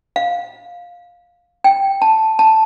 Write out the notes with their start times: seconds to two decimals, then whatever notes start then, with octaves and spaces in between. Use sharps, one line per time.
0.16 F5
1.64 G5
2.02 A5
2.39 A5